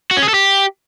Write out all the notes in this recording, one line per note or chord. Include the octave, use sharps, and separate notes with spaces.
F#4
C#4
G#4
A4
G4